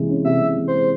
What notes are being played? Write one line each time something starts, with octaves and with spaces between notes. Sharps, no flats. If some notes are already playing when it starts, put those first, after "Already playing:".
Already playing: C3 E3 G#3
C#4
C3 E5
C3
E3
C5
G#3